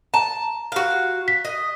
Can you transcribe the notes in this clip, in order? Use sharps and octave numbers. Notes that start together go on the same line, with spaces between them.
A5 A#5
F#4 F5
B6
D#5